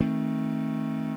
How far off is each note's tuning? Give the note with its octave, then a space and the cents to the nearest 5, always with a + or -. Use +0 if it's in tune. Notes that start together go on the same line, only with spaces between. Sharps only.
D#3 +20 A3 +0 C4 +25